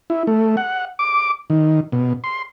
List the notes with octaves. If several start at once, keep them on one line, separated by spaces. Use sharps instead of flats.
E4
A3
F#5
D6
D#3
B2
C6